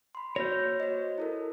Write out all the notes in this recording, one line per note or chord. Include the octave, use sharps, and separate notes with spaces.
B5 C6
A#3 F#4 C#5 G6 A#6
F#4 C5 D#5
E4 A4 A#4